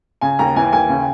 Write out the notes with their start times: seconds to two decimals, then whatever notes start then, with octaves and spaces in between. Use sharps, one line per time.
0.21 C#3 G#5
0.39 D#2 A#5
0.56 E3 G#5
0.73 D#2 G#5
0.89 C#3